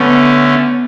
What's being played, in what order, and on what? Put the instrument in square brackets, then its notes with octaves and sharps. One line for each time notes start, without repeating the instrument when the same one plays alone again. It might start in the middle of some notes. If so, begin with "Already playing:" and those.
Already playing: [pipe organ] D3 A3 C#4 [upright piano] B3